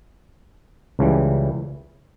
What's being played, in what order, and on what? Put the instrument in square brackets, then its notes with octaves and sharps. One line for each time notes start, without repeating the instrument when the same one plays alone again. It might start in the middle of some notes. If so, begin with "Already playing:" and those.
[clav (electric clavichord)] C#2 C#3 E3 G3